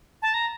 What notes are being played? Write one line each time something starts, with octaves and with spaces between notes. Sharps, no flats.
A5
A#5